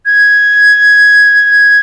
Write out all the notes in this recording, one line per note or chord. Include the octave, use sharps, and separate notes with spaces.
G#6